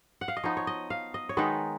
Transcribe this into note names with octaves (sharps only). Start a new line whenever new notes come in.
F#5
F5
D#5
F3 B3 D#4 C#5
C#5
D#5
F5
D#5
C#5
D#3 G#3 B3 D#4 B4